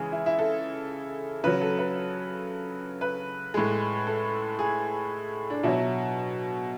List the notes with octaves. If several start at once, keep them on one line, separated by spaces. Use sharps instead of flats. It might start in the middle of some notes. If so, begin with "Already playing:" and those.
Already playing: C#3 E3 G#3 G#4
E4
E4
A4
C#3 F#3 B4
A4
B4
B4
A2 G#3
A4
G#4
D4
B2 F#3 E4